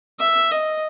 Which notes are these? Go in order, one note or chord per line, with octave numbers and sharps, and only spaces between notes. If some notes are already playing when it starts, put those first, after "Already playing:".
E5
D#5